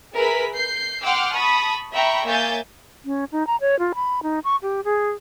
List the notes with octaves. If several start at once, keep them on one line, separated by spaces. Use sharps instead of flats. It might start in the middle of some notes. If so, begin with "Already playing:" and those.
G#4 A#4 B4 E5 B5 B6
G6 C7
F#5 G5 C6 D6 E6 F6
A5 B5 C#6 D#6
E5 G5 A#5 B5 C#6
A#3 C#5 E5 G#5 G6 A6
C#4
D#4
A#5
C#5
F4
B5
D#4
C#6
G4
G#4